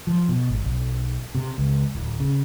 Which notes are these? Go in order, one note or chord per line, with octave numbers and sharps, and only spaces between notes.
F3
B2
G#1
B1
C3
C#2
D1
C#3